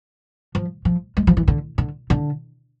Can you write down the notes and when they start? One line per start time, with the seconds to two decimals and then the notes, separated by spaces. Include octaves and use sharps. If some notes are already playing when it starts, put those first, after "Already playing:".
0.55 F3
0.85 F3
1.17 G#3
1.27 F3
1.37 E3
1.48 D3
1.78 D3
2.10 D3